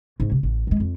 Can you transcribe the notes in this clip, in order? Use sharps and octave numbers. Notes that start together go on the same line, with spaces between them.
G#2 C#4
C3
A1
D#3 G#3
F2